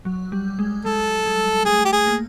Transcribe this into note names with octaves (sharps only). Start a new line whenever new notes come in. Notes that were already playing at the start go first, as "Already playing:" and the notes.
F#3
G3
G#3
G#3 A4
G#3
A3 G#4
G4
G#4
A#3